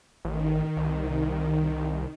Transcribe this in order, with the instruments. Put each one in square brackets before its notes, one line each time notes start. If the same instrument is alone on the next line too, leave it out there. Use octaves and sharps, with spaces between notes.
[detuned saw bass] A1 [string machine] D#3
[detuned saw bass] C2